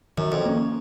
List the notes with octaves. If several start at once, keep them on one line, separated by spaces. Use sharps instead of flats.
F#2 D#3
F2
A#3 C#4